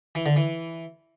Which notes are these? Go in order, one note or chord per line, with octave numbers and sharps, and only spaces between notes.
E3
D3
E3